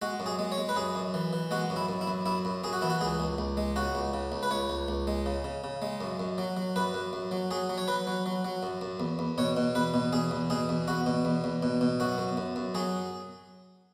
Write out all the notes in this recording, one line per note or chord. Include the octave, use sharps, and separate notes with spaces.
G#3 F#4
F#2
G#4
G#3
C#5
G#3
B4
F#2 G#4
F#2
E3
E3
G#3 F#4
F#2
E4
F#2
E4
F#2
F#2 E4
F#2
F#2 G#4
F#4
E3 E4
F#4
C#2 G#4
C#2
C#2
G#3
C#3 F#4
C#2
C#3
C#2
B4
C#2 C#5
C#2
C#2
G#3
C#3
C#3
C#3
G#3
F#2
F#2
F#3
F#3
F#2 B4
F#2
F#2
F#3
F#3 G#4
F#3
C#5
F#3 B4
F#3
F#3
F#3
F#2
F#2
E2
E2
B2 C#5
B2
E2 B4
B2
E2 G#4
E2
B2 G#4
E2
E2 F#4
B2
E2
E2
B2
B2
F#2 F#4
F#2
F#2
F#2
F#3 G#4